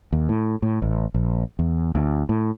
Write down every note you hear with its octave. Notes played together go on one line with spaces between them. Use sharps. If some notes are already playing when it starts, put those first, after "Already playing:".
D#2
A2
A2
A1
A#1
E2
D2
A2